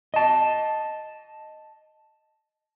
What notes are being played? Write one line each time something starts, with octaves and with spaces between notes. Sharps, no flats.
D#5 A5